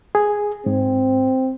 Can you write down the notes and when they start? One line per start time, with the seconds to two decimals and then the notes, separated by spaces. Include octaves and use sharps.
0.15 G#4
0.66 G#2 C4